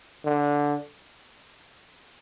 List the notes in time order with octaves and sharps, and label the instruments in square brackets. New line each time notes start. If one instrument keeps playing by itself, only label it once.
[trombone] D3